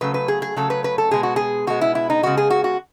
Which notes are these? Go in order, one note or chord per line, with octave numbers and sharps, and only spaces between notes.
C#3 F#3 A3 B4
B4
G#4
G#4
C#3 F#3 A3 A4
B4
B4
A4
B2 G#3 B3 G#4
F#4
G#4
B2 G#3 B3 F#4
E4
E4
D#4
C#3 G#3 B3 F#4
G#4
F#4
F#4